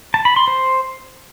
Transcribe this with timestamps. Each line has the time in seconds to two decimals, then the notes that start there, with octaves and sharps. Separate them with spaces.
0.14 A5
0.25 B5
0.36 C6
0.48 C5